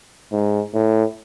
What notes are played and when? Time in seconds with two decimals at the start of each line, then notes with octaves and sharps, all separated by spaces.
0.32 G#2
0.74 A2